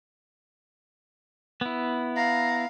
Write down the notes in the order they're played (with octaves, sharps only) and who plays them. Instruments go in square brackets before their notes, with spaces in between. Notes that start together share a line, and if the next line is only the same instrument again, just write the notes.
[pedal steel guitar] B3 E4
[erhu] F5 [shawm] A#5